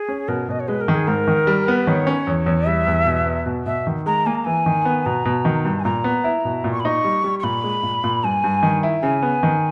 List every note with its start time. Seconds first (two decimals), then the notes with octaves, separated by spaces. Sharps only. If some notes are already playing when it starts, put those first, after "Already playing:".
Already playing: G#4
0.08 C#4
0.28 B2 A#4
0.49 B2 D#5
0.60 C#5
0.68 G#3 B4
0.81 A#4
0.88 D#3
0.95 G#4
1.08 G#2 A#4
1.28 D#3
1.47 G3
1.68 B3
1.78 B4
1.87 D#3 C#5
2.07 C#4
2.27 E2
2.46 E2
2.66 G3 E5
2.87 E2
3.06 B2
3.26 B3
3.46 B2
3.66 B2 E5
3.87 D#3
4.06 G#3 A#5
4.26 A#3 G#5
4.35 A#5
4.45 E3 G#5
4.66 D#3
4.85 B3
5.06 B2 A#5
5.25 B2
5.45 D#3
5.65 G2
5.80 G#5
5.85 A#2 A#5
6.04 B3
6.24 E4
6.45 B2
6.64 A#2
6.72 C#6
6.80 B5
6.85 D#4 C#6
7.04 G3
7.24 G3
7.40 C#6
7.43 A#2 B5
7.64 G#3
7.83 A#2
8.04 A#2
8.24 G2 G#5
8.44 G2
8.63 D#3
8.83 E4
9.02 C#3 G#5
9.22 B3
9.43 D#3